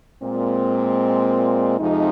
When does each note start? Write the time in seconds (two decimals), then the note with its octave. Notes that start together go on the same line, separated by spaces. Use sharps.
0.21 A#2 G#3 C4
1.78 F2 C3 F3 G#3 D#4